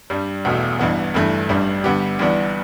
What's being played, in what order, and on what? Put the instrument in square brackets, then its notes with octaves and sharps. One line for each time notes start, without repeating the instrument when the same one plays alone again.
[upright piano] G2 G3 D4
E1 E2 B2 A3
A1 G2 E3 B3
G1 G2 E3 A3
A1 G2 G3 D4
G2 D3 B3 G4
G1 G2 E3 B3 D4